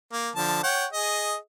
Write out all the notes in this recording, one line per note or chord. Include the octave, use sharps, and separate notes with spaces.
A#3
D3 F3 A5
C#5 F#5 G5
G#4 D#5